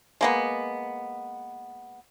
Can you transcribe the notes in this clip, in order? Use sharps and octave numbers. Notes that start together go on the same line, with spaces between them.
G#3 A#3 B3